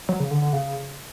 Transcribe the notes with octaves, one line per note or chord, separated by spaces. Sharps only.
F#3
C#3
D3
D3
C#3